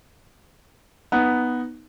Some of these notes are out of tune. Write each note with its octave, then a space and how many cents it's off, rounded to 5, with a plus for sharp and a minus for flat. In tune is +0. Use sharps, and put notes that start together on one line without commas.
B3 +0 D#4 +0